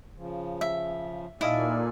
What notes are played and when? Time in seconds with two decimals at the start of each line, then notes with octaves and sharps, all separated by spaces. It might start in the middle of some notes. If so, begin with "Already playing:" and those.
0.16 C#3 F3
0.61 E5
1.41 A#2 D#4 E4 A4 D5 D#5 F5 G#5